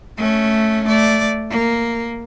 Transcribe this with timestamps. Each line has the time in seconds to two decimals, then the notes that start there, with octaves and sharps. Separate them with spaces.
0.17 A3 C#4
0.84 A3 D5
1.50 A#3